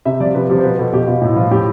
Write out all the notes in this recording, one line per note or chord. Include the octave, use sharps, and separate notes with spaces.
C3 E5
F3 D5
C3 B4
F3 G4
C5
B2 B4
B2 A4
B2 G4
B2 F4
A2 E4
F3 F4
A2 G4